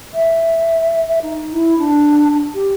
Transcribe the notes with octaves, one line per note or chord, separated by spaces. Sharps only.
E5
E5
D#4
E4
D4
G4